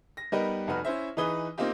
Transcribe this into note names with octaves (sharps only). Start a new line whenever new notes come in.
A#6
G3 B3 D#4 A#4 B4 D#5
F1 D#4 F#4 B4 F6
C#4 E4 C5 E5
E3 D#4 G#4 B4 D#6 G7
A#3 C4 D#4 F4 G4